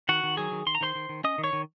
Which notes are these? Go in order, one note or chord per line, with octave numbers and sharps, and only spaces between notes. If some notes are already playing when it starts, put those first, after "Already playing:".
D#3 F#4 F#5
D#3
F#3 G#4 G#5
D#3
D#3 C6
A#5
D#3 C5 C6
D#3
D#3
C#4 D#5 D#6
D#3
C#5 C#6
D#3